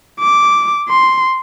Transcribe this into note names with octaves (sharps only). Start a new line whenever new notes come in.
D6
C6